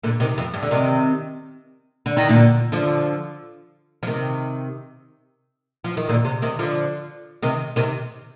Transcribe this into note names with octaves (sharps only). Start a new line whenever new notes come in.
A#2 D3
C3 D#3
F2
G2
D3
C3 D#3
D3
D#3
A#2 D3
D3 F3
F3
C3 D#3
F3
D#3
A#2 D3
C3
C3 D#3
D3 F3
C3 D#3
C3 D#3